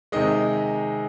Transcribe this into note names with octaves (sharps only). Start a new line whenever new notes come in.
C3 D#3 G#3 D#5